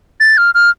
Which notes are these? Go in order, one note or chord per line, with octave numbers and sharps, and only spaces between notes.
A6
F6
F6